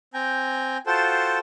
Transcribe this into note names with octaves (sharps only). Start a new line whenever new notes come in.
C4 G5 G#5 A#5
F4 F#4 A4 C5 G5 A5